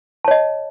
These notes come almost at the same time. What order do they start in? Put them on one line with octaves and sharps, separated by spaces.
A5 C#5 D#5